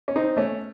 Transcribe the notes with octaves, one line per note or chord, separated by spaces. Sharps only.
C#4
C4 D#4
A3 C#4